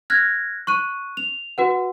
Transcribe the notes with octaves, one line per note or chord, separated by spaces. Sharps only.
F6 F#6 G#6 A#6
C#6 F#6 D#7
F7
F#4 B4 F#5